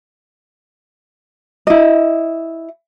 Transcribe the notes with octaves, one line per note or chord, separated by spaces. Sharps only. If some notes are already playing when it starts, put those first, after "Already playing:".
E4 D#5